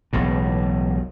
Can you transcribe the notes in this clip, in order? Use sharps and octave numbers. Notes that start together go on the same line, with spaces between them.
E1 B1 A2